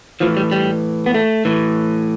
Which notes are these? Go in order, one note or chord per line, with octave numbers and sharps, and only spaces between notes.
A2 E3 F3
G3
G3
B3
A3
A2 E3